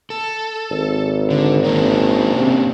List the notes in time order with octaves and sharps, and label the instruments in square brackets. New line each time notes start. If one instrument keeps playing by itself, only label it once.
[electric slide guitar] A4
[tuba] G#1
[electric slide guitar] D3
[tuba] G#1 [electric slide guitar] A#3 C#4 D4
[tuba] C3